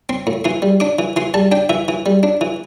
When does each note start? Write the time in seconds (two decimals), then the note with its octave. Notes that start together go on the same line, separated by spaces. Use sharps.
0.09 C4 C6
0.27 A2
0.44 E3 C6
0.62 G3
0.80 D4 D6
0.99 E3
1.16 E3 C6
1.34 G3 A5
1.52 D4 G5
1.69 E3 E5
1.88 E3
2.06 G3
2.23 D4
2.41 E3